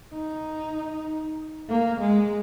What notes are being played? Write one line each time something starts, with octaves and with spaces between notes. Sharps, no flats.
D#4
A#3
G#3